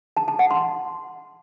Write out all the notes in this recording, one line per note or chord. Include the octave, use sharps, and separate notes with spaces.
A5
A5
F#5
C6